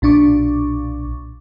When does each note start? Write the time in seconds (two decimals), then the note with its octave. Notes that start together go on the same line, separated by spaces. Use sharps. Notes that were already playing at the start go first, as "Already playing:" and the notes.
0.02 B1 A#2 D4 C#6 D6